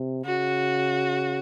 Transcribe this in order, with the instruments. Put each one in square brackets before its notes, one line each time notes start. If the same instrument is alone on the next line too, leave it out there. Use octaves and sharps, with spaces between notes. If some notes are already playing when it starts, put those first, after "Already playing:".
Already playing: [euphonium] C3
[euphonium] C#3 [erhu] F#4